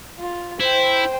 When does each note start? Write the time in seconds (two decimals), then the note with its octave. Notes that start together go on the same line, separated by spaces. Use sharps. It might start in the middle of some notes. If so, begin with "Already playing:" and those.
0.18 F4
0.60 E4 C5 G5